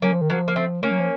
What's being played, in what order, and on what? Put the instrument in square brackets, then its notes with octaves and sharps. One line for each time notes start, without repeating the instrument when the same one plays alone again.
[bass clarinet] F#3 [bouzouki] A#3 C#4
[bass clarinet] F3
D#3
[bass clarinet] F3 [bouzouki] F#3 A#3
[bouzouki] A#3
A3 C4
[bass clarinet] A3 [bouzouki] A#3 C#4
[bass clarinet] F#3
F3